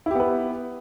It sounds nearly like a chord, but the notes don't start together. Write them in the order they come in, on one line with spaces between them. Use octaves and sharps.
E4 G4 B3 B4